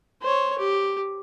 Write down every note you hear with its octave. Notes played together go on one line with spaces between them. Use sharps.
C5 C#5
G4